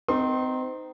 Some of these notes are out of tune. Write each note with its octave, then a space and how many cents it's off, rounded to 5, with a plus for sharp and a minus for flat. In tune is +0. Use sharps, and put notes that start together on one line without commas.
C4 -30 D#4 +0 C6 +25